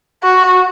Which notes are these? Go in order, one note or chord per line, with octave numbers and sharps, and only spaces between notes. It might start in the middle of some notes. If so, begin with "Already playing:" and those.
F#4